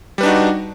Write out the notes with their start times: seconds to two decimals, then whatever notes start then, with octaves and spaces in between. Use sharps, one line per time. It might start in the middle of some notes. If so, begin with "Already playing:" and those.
0.18 G3
0.21 B4
0.23 D4
0.26 D#4
0.28 F#4